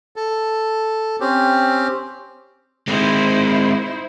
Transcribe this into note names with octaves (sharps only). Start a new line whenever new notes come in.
A4
C4 C#4 G4
G#3 C4 D#4 E4 C5